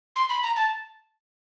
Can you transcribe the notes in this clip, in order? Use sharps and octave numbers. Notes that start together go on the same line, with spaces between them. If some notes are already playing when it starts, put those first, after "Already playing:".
C6
B5
A#5
A5